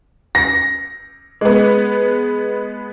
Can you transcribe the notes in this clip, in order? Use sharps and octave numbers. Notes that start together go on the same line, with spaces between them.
A#6
G#3 B3